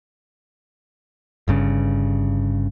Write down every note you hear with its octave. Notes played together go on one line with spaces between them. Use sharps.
G1 G2 C#3